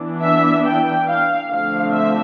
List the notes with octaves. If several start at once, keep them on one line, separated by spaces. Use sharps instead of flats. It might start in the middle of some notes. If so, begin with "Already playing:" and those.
Already playing: E3 B3 D4
E5
G5
F5
D3 F3 A3 C4 F5
E5